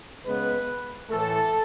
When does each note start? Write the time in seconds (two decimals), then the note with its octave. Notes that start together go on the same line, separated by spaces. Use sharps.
0.26 C#3 G#3 B3 B4
1.10 A2 E3 A3 A4